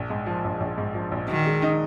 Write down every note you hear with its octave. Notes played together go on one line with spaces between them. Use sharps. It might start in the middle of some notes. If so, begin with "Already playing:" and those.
Already playing: A#1
G#2
F3
A#1
A#1
G#2
F3
A#1
D#3 F#4
G#3
D#4